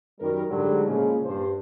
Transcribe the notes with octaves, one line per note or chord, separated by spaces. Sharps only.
F#2 D#3 G3 A#4
G#2 D3 F#3 G3
A#2 C#3 F3 G#3
G2 C5